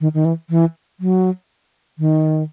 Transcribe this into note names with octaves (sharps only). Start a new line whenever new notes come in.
D#3
D#3
E3
E3
F#3
D#3